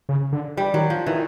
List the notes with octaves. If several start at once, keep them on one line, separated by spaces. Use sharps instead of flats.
C#3
D3
E3 G3
D#3 F#3
F3
D#3 E3